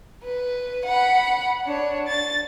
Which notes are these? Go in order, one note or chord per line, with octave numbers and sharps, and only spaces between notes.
B4
F#5 B5
D4 C#5
A6